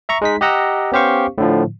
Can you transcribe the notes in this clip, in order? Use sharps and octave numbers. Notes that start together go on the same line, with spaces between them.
E5 A#5 C#6
G#3 D#4 B6
G4 D#5 F#5 A#5 E6
B3 C#4 G4 C5 F5 C#6
A2 D3 F3